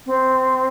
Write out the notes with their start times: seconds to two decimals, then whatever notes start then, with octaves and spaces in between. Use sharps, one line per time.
0.06 C4